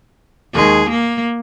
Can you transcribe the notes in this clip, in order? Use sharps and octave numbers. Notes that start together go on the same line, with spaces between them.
D#2 D#3 G#3 G#4
A#3